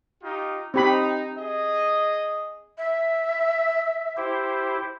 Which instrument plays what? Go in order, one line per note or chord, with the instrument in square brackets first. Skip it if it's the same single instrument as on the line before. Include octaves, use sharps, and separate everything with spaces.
[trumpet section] D#4 F4 G4
[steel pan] C4 G4 B5 [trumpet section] D#4
[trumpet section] G#4 D#5
[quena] E5
[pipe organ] E4 G4 C5